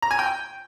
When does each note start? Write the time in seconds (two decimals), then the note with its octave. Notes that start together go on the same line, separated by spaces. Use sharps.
0.02 A#5
0.11 G#5
0.19 G5